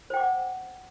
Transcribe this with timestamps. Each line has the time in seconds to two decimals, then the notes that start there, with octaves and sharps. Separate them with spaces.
0.10 C5
0.14 G5
0.17 D6
0.20 F#5